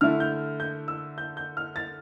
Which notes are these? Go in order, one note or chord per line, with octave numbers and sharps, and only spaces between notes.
D3 A3 E4 F6
G6
G6
E6
G6
G6
F6
A6